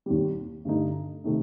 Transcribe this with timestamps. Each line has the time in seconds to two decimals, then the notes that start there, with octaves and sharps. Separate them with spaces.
0.06 D#2 D#3 G3
0.65 G2 D3 A3 D#4
1.24 C3 D#3 A3 D#4